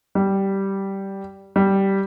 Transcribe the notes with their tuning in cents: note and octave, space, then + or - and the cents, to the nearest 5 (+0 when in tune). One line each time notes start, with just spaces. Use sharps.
G3 -10
G3 -10